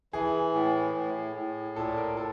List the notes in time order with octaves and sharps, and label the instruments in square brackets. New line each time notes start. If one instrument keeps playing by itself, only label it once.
[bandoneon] E3 [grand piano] G#4
[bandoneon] A2
A2
A2
[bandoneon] A#2 [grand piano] A4
[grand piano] A#4
A4